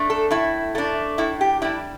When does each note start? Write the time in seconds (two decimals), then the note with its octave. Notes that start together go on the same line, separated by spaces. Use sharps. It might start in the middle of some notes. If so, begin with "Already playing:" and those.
Already playing: A3 D4
0.10 A4
0.31 A2 E4
0.75 A3 D4
1.18 A2 E4
1.41 G4
1.62 G3 D4 E4